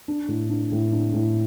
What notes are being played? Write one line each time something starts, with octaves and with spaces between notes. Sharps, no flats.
D4
A2
D4
A2
D4
A2